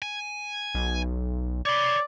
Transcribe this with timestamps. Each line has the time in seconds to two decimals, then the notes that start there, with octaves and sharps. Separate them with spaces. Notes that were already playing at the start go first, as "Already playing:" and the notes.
0.02 G#5
0.75 B1
1.66 C#5 D5 B5